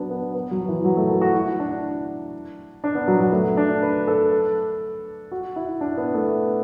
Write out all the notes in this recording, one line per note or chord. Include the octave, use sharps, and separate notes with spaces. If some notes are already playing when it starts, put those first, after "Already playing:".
Already playing: F#3 B3 D4
B3
B3
F#3
E3
F#3
A3
A4
F#4
E4
D4
D4
B3
F#3
F#3
A3
D4
B4
A4
F#4
E4
D4
B3
A3